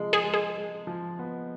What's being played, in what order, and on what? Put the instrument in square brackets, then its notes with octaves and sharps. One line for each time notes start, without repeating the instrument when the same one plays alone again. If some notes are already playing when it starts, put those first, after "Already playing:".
Already playing: [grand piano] C3 F3 G#3
[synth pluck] G#4
[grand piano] G#3
[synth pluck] G#4
[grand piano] G#3
F3
B3